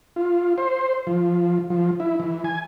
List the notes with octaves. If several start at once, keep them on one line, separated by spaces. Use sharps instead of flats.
F4
C5
F3
F3
E4
E3
G#5